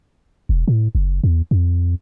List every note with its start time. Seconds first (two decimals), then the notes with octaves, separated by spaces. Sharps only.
0.49 E1
0.68 A2
0.95 F#1
1.24 E2
1.51 F2